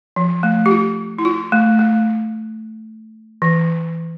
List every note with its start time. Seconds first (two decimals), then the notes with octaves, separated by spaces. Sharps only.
0.16 F3
0.43 A3
0.66 G4
0.71 F4
1.18 E4
1.25 F4
1.52 A3
1.79 A3
3.42 E3